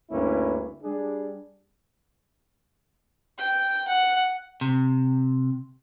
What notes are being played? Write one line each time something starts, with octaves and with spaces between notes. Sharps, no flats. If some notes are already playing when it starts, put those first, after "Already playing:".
D2 G2 A#3 C#4 E4 B4
G3 D4 G#4
G5
F#5
C3